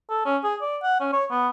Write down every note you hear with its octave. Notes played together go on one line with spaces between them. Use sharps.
A4
C#4
G#4
D5
F#5
C#4
C#5
B3